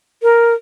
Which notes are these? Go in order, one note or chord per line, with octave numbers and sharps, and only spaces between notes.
A#4